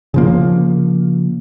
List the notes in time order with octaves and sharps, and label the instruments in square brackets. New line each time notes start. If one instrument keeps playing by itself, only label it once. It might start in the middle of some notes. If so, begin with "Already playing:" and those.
[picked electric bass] C#3 F3 A#3